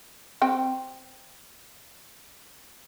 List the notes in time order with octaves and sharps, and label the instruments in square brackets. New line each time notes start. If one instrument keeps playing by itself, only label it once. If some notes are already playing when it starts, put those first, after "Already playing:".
[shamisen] C4 G5